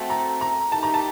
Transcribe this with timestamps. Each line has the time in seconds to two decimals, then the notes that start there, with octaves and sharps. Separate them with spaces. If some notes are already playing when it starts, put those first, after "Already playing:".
Already playing: A3 C4 F#4 A4
0.10 A#5
0.41 A#5
0.72 A3 D#4 G4 A5
0.83 A#5
0.94 A5